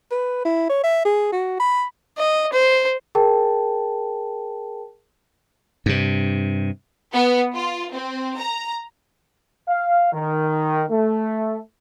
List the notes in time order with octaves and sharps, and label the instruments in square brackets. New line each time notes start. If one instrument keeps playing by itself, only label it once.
[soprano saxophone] B4
E4
C#5
E5
G#4
F#4
B5
[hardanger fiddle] D#5
C5
[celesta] G#4 A#4 G5 A5
[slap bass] G2 C3
[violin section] B3
F4
C4
A#5
[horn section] F5
D#3
A3